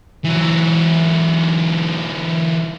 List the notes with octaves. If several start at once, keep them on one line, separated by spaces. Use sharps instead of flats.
E3 F#3